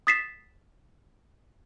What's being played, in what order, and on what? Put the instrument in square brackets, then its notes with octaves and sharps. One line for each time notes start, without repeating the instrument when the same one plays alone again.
[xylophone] D#6 A6 B6 C7 E7